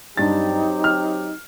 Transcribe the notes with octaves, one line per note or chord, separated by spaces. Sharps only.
G2 F#3 C4 D#4 G4 A6
F6